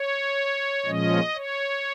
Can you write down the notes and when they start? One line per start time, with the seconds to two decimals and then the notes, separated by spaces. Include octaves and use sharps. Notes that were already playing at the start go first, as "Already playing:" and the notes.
Already playing: C#5
0.86 A#2 F3 G#3 C#4 D#5
1.35 C#5